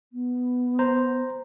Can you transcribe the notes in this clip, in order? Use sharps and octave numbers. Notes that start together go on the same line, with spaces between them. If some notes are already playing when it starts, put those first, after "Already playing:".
B3
C5 A#5